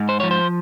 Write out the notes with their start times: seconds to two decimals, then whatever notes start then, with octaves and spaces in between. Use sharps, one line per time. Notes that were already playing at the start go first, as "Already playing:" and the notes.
Already playing: G#2
0.09 C5
0.20 F3 C#5
0.31 C5